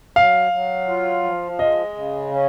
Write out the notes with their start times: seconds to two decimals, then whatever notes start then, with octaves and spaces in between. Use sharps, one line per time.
0.16 F#3 F5
0.52 F#3
0.88 F4
1.23 F3
1.59 G#3 D#5
1.95 C#3
2.31 C#4